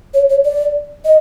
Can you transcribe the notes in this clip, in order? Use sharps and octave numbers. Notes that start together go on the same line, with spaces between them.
C#5
C#5
D5
D#5